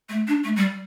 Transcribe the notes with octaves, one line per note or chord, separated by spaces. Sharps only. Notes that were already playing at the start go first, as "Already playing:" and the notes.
A3
D4
A3
G3